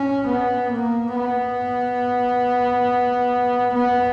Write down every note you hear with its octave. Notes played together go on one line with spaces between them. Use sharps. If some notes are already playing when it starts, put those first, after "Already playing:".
Already playing: C#4
B3
A#3
B3
B3